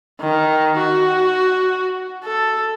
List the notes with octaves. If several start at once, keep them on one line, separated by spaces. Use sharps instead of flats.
D#3
F#4
A4